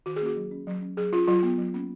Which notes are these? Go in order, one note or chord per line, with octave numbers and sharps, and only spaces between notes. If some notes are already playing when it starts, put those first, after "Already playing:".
D#3 F#4
G#4
A#3 C#4 F#4
F#3
C#4
F#3
C#4
F#3 G#4
C#4 F4
F#3 F4
B3
F#3
A#3 C#4